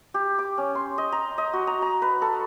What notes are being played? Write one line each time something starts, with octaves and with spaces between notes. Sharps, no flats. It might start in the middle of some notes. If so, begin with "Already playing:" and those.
G4
D6
C#4
C6
D#5
A#5
D#5
F#4
A#5
A#5
B4
A4